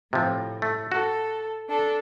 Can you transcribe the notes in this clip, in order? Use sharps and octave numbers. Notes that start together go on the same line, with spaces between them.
A2 C3 F3
A3
F#4 A4
D4 A4